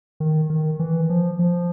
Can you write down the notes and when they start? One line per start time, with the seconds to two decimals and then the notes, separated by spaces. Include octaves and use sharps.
0.20 D#3
0.50 D#3
0.80 E3
1.10 F3
1.39 F3